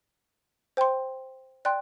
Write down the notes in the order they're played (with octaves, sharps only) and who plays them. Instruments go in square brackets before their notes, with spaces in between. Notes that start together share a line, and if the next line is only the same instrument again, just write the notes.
[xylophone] C5 G5 C6
D5 G5 C6 F#6